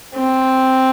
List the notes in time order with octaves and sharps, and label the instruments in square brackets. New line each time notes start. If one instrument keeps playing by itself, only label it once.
[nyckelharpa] C4